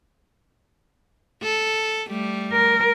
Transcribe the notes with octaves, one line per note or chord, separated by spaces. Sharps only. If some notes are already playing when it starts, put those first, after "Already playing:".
A4
G3 A3
A#4